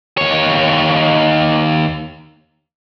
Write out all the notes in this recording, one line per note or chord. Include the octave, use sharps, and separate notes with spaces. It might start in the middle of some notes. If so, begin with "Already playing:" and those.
D#2 C#5